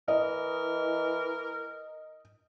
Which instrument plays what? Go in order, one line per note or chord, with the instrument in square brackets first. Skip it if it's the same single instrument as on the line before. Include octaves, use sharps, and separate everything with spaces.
[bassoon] E3 [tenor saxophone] A#4 [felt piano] D#5